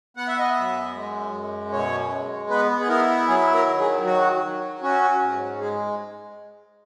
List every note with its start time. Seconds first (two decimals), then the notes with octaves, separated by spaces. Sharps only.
0.17 B3 F#5
0.28 E5
0.39 D#5
0.50 E5
0.55 F#2
0.95 G#3
1.33 F#2
1.72 B2 C#5
2.11 G#3
2.49 B3 B4
2.80 G#4
2.89 E4 A#4
3.28 F#3 G#4
3.54 A#4
3.66 D#3
3.79 G#4
4.05 F#3 F#4
4.44 F#3
4.83 C#4 F#4
5.22 G#2
5.60 G#3 G#4